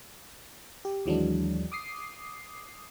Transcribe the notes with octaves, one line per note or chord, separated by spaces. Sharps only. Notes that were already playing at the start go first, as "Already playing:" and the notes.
G4
D#2 E3 F#3 G#3 D4
D6 D#6 C7